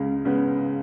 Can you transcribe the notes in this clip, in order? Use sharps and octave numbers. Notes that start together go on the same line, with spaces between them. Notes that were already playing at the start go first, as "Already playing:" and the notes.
Already playing: C#2 C#3 G#3
C#3 G#3 B3